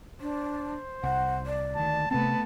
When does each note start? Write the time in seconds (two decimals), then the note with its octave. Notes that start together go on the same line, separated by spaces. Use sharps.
0.21 D4 C5
1.03 C2 F#5
1.46 D5
1.76 D2 D#3 A5
2.11 C3 A3 B3 C4 A5